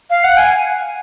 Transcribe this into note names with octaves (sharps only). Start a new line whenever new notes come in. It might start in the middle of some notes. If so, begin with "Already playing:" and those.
F5
F#5
G#5